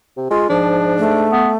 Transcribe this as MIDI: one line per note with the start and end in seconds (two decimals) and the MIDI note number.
0.17 0.26 48
0.31 0.46 56
0.31 0.48 65
0.50 1.34 44
0.50 1.07 53
0.50 1.30 62
0.98 1.57 57
1.32 1.50 59